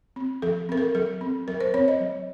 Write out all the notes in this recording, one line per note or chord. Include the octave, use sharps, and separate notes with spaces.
C4
F3 A4
C4 A#4
A4
F#3 A4
C4
F#3 A#4
C5
C4 C#5
D#5
F#3